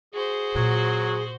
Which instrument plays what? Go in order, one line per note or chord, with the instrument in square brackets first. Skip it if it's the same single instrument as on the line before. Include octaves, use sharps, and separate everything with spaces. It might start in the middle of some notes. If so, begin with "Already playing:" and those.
[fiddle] F#4 C5 [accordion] G#4
[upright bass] A#2 [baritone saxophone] F#3